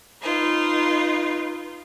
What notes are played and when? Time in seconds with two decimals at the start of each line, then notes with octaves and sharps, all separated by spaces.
0.22 D#4 F4 B4